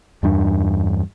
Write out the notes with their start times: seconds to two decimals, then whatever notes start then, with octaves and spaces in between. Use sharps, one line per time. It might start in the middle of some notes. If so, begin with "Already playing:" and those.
0.23 E2 G2 D4